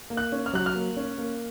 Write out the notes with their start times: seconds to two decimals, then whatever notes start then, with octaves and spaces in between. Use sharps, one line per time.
0.10 A#3
0.17 F#6
0.32 C#4
0.46 F6
0.53 F#3 F#6
0.66 F6
0.75 A#3
0.97 C#4
1.18 A#3